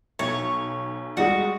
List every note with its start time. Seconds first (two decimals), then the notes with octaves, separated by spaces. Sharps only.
0.19 B1 C#5
1.17 G3 G#3 D#4 F#4